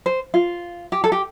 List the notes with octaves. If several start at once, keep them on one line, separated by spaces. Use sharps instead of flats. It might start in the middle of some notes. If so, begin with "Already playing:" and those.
C5
F4
G4
A4
G4